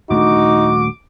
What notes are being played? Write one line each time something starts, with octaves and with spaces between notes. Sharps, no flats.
D#1 A3 D4 D#4 F#4 D6